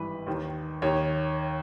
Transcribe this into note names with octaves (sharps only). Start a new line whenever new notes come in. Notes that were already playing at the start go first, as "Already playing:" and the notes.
Already playing: G#1 G2 E3 B4
D#2 D#3
D#2 D#3 C#5